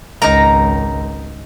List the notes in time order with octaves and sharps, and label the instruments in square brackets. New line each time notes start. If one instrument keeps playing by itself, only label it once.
[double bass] G#1 C#2 [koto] D#4 A#4 [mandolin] A#5